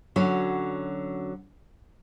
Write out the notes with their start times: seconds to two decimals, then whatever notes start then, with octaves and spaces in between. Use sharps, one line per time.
0.16 D3 F#3 C#4 F#4 C#5